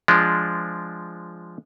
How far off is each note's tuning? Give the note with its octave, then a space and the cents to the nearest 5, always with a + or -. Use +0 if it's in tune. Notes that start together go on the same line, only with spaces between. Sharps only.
F3 -10 G#3 +0 D4 -10